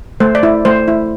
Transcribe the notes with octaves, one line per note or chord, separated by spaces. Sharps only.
A3 C5
D5
E4
A3 C5
E4